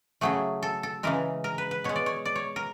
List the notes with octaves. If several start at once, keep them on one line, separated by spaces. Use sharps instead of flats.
C#3 F#3 A3 G#4
A4
A4
C#3 E3 G#3 A#4
A#4
B4
B4
B2 G#3 C#5
D5
C#5
D5
C#5
A#4